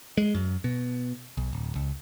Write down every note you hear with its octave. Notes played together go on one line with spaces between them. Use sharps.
G#3
F#2
B2
B1
D1
C#2